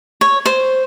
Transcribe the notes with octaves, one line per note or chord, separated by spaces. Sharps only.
C#5
C5